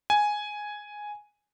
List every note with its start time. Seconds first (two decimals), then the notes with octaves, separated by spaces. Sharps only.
0.10 G#5